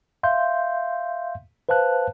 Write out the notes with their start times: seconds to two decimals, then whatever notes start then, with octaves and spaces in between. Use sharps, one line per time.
0.23 E5 F5 C6 G6
1.69 B4 C5 F5 A5 F#6